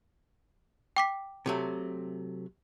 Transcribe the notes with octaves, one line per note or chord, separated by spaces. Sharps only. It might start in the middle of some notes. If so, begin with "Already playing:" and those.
G5 D6 B6
C3 F#3 A3